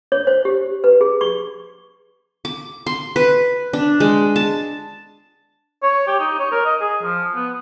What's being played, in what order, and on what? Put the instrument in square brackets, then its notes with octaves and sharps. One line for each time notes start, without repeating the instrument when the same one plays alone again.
[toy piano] C#5
C5
G4
B4
G#4
C#6
[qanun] D6
C6
B4
D4
G#3
A5
[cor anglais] C#5
G4
D#4
C#5
A#4
D#5
G#4
F3
B3